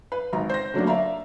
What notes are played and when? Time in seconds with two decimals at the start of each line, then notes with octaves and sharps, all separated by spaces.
0.12 B4
0.33 G#1 A#5
0.49 C5 A#6
0.74 D3 F#3 A3 A#3 D4
0.87 D5 E5 F5 A#5